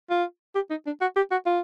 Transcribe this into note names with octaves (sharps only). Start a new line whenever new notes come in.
F4
G4
D#4
D4
F#4
G4
F#4
F4